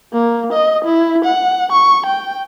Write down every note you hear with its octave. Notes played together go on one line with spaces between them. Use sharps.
A#3
D#5
E4
F#5
C#6
G5